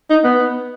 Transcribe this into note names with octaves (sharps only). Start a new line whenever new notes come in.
D#4
B3